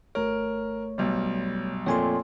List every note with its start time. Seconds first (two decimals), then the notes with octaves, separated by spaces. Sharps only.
0.15 G#1 A3 A#4 C#5
0.98 B1 G3
1.86 F2 A#2 A3 C#5 G#5 C6